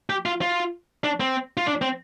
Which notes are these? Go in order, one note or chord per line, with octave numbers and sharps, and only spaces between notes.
G4
F4
F4
D4
C4
F4
D4
C4